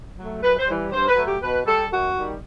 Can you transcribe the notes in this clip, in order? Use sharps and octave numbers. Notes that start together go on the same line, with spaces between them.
F#3 A3
F#2 B4
C5
E3 G3
G2 C5
B4
F#3 A3
G4
B2 B4
G3 A4
F#2 F#4
D#3 G3